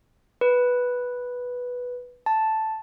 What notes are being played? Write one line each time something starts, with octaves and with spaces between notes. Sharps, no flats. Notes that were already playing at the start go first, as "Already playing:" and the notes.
B4
A5